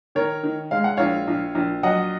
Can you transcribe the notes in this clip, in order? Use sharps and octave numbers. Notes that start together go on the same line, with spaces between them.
D#3 A#4 C#5
D#3
G#3 F5
F#5
A#1 C#5 F5
A#1
A#1
F#3 D#5 F#5